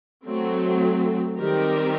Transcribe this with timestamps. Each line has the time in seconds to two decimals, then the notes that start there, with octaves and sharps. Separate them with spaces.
0.24 F#3 A3 C4
1.40 D#3 G3 C4 G4 A#4